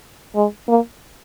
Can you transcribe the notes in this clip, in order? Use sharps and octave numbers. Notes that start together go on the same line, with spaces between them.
G#3
A#3